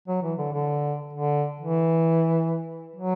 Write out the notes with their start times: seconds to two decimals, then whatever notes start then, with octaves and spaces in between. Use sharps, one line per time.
0.08 F#3
0.22 E3
0.38 D3
0.53 D3
1.13 D3
1.60 E3
2.96 F#3